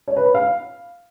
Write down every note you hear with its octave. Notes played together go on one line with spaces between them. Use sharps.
C#5
B4
B5
F5